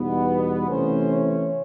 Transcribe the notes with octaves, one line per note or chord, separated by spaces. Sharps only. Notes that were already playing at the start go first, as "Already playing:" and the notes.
Already playing: E2 B2 G3 B3 D#4
B4
C3 E3 A3 C#4 C5
C#5